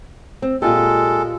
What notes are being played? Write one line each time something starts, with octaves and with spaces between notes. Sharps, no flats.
C4
A#2 G#3 F4 G4 A4